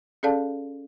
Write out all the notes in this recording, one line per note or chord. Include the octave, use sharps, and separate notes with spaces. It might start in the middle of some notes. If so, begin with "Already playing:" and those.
C#4 G#4 A4 D5 F5 A5